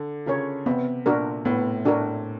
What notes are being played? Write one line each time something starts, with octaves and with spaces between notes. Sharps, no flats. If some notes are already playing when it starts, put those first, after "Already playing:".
Already playing: D3
C#3 F4 A#4 C#5
C3 B3
A#2 D4 F#4 A#4
A2 B3
A2 D4 F#4 A#4